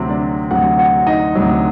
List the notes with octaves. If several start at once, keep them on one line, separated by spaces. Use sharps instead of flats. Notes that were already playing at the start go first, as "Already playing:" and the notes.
Already playing: D2 C3 F#3 C4
D4 D5
D2 C3 F#3 F#4 F#5
F#4 F#5
D#4 D#5
D2 C3 F#3